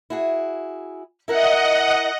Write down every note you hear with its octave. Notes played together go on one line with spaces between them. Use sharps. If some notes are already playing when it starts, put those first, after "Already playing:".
E4 F#4 G#4
E4 A#4 D#5 E5 F#5